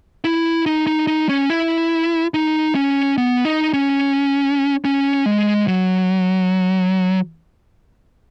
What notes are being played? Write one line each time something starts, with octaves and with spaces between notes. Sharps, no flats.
E4
D#4
D#4
D#4
C#4
E4
D#4
C#4
B3
D#4
C#4
C#4
G#3
F#3